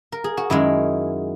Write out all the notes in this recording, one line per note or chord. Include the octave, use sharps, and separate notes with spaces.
A#4
G#4
F#4
F#2 D#3 G#3 E4